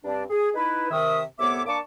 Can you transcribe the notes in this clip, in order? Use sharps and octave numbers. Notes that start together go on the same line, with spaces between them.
G2 C4 D4
G#4
D#4 E4 B4
C3 D#3 E5 D#6
C2 A2 B3 C#5 E5 D6
A#3 D4 A5 C#6 D6